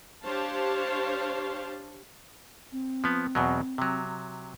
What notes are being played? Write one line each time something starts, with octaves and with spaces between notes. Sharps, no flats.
D4 G4 C5 C#5 F5 A5
C4
F3 B3
E2 B2 F#3
C3 F#3